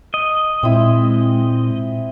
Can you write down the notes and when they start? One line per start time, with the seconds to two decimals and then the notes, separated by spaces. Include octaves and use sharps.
0.14 D#5
0.63 A#2 G#3 C4 E4